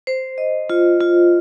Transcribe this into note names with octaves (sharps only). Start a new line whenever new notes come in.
C5
D#5
F4
F4